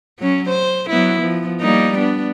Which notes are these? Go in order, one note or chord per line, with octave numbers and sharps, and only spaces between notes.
F#3 C#4
C5
F#3 B3 E4
F3 B3
G3 A#3 D#4
B3 D4